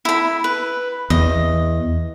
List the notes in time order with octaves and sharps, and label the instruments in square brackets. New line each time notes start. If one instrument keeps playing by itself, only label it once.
[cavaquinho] E4 B5
B4
[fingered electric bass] E2 [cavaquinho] D#5